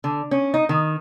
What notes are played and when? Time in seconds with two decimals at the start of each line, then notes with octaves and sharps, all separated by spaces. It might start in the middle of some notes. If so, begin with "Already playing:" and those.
0.04 D3
0.31 C#4
0.54 D#4
0.69 D#3